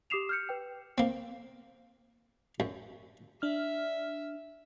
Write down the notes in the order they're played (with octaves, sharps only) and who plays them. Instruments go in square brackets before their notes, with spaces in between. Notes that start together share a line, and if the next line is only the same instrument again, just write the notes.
[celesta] G4 D6 D#6 C7 E7 F7
F6 G6 C#7
B4 G5
[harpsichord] A#3 C4
F#2
[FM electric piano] D4 F6 [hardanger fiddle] E5